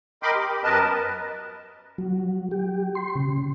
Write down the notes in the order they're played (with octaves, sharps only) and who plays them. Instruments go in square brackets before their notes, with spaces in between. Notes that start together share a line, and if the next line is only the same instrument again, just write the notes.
[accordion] A#4 D#5 G5 B5 C6 D6
G4
F#2 B3 A#4 B4 D#5 A5
[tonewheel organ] F#3
G4
C6
C#3